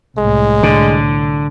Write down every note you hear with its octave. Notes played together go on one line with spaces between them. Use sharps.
C2 A2 G#3
D3